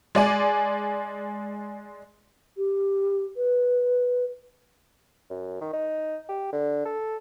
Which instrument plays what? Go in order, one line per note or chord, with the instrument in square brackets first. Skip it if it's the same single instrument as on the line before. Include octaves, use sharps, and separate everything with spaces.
[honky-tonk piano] G#3 D5 G#5
[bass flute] G4
B4
[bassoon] F#2
D#3
D#4
G4
D3
A4